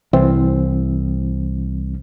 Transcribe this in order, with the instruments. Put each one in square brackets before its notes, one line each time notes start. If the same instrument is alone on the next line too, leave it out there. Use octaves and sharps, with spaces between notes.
[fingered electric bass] C2 [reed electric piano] E3 C4